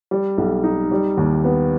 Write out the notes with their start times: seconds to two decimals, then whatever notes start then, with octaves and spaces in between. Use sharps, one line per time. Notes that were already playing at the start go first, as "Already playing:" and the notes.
0.11 G3
0.38 B1
0.64 D#4
0.91 G3
1.18 D#2
1.44 B3